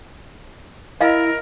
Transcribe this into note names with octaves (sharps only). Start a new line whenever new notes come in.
E4 A#4 D#5 F5